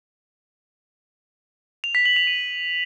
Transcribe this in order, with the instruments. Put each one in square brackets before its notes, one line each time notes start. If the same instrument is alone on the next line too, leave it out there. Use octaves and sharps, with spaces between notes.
[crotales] F7
B6
F#7
F7
D#7